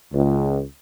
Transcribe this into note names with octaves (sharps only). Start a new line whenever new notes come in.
C#2